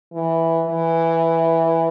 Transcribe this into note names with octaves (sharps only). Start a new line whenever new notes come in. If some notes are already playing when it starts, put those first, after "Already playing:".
E3
E3